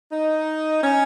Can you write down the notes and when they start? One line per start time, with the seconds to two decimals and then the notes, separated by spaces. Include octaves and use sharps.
0.11 D#4
0.83 C#4